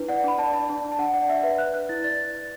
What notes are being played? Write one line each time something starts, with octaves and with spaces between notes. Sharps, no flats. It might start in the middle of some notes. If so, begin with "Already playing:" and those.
Already playing: D4 E4 B4
D5 F#5
D4 B5
D5 A5
D5 A5
D4 A5
D4
A5
D4 F#5
D5 F#5
D5 E5
B4 E5
B4 F#6
B4 F#6
E4 A6
D5 A6